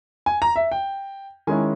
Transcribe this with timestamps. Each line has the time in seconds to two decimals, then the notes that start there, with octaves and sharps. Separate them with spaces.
0.26 G#5
0.42 A#5
0.56 E5
0.71 G5
1.47 D#3 G#3 C#4 E4 G#5